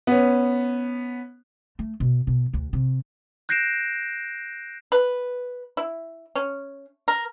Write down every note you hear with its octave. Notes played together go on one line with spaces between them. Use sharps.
B3 C#4
A3
B2
B2
D2
C3
F#6 G6 A#6 C7 D7 E7
B4
E4
C#4
A#4